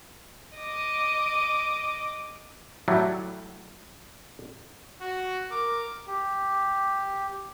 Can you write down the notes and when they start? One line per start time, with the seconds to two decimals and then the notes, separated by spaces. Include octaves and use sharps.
0.57 D#5 D6
2.88 A2 F#3 G3 A3
5.01 F#4
5.51 A#4 D6
6.07 G4